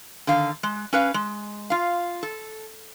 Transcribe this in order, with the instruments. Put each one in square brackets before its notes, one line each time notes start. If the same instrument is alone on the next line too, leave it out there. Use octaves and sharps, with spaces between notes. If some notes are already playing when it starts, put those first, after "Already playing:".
[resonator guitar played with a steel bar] D3 D#3 F5
G#3
C#4 B4 F5
G#3
F4 F5
A4